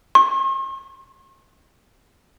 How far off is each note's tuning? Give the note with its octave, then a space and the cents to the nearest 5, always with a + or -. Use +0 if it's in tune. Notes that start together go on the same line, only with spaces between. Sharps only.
C6 +45